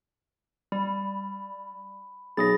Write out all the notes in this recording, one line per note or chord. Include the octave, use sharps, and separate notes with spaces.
G3 B5
B1 G#4 B5 D#6 A6 A#6